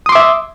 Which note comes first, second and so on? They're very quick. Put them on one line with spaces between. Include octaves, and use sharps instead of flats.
D#6 C6 D6 E5